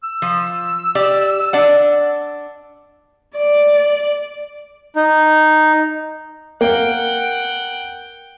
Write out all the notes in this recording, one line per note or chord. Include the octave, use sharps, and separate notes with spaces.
E6
F3
G4 D5
D4 D5 F#5
D5
D#4
A#3 F#5 G5